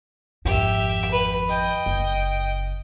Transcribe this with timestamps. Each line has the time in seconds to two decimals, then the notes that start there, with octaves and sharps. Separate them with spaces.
0.45 G#1 F2 G4 E5
1.11 B4
1.49 D#5 G5
1.86 F#1